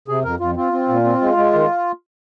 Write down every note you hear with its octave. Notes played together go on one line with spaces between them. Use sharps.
C3 G#4
F2 A#4
F2 F4
C4 F4
C4
A#2
C4
G#3
G#3
D#3